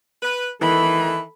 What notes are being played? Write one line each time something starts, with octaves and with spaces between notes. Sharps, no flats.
B4
D#3 E3 A4 B5